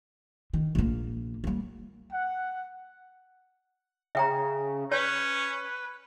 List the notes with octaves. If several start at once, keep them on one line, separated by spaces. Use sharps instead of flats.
D#3
A#1 A#3
G3 A#3
F#5
C#3 E5 G5 A#5
C#4 B4 C#5